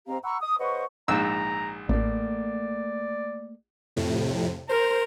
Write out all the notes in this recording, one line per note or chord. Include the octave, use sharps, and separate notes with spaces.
G#2 C4 G4 F5 A#5
F#5 A#5 B5 C#6 E6
D#6
C#3 B4 C5 D#5 F#5 C#6
A#1 G#2 A#5 E6
A1 A3 A#3 D5
F2 A2 C3
A#4 C5